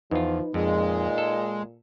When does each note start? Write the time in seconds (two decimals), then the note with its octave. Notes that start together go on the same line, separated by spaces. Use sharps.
0.11 E2 F3 D#4 F4 B4
0.54 F2 A#2 G#3
1.18 A4